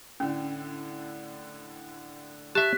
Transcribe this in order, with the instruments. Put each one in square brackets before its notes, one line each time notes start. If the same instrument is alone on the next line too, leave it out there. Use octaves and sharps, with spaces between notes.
[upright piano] A2 D3 [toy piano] C#4
[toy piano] G4 [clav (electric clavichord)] E5 A5 [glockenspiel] F#6 B6